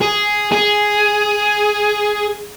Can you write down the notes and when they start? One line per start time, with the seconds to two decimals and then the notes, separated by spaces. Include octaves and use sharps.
0.01 G#4
0.52 G#4